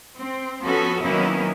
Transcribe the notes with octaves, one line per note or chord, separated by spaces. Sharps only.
C4
F3 B3 C#4 F#4 A4
D#3 F#3 A#3 B3 C#4 E4